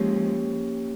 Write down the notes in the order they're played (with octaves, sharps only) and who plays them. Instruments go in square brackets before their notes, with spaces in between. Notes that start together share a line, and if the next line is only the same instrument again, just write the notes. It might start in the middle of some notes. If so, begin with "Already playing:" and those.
Already playing: [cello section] F3 G#3 [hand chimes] A#3 C#4 G4 C#5